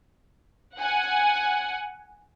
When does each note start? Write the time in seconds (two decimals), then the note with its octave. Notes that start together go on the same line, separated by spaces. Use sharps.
0.78 F#5 G#5